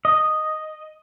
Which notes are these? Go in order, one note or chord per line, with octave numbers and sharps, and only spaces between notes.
D#5